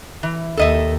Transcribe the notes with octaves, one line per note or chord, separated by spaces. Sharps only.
E3
D#2 A4 D#5 E5